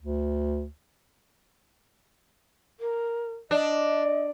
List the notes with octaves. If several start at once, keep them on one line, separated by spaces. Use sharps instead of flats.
D2
A#4
D4 D#5